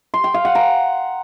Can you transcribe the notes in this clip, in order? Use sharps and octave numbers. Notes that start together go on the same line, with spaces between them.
C6
G5
F5
F#5
A#5